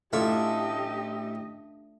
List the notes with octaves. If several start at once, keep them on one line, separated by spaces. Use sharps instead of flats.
A1 A3 D4 F4 G4 D#5 E5 G#5